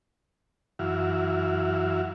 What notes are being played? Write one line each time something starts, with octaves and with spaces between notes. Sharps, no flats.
F#2 E3 E4 F#4 F5